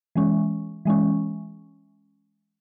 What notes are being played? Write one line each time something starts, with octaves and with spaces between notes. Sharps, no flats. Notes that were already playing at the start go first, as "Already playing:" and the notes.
E3 G#3 C#4
E3 G#3 C#4